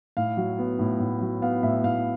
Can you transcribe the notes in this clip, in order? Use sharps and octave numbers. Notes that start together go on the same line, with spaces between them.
A2 F5
F#3
B3
A2
A2
F#3
B3 F5
A2 E5
A2 F5